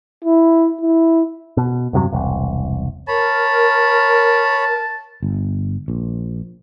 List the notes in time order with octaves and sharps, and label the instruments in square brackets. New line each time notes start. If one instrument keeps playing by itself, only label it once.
[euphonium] E4
E4
[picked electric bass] B2
E2 G2 C3 F#3
E1 C2
[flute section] A#4 [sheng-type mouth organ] C#5 B5 [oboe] A5
[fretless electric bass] G1
A#1